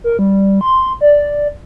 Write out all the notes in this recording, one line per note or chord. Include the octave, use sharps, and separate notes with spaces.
A#4
G3
C6
D5